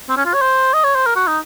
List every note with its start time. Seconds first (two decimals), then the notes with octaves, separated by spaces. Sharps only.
0.09 C4
0.17 C#4
0.26 F4
0.34 C#5
0.41 C5
0.74 D#5
0.84 C#5
0.95 C5
1.06 A#4
1.16 F#4
1.27 D#4